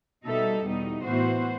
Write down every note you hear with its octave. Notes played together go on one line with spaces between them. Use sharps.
B2 G3 D#4 A4 E5
E2 B2 G3 B3 D#4
A2 E3 B3 F#4 C5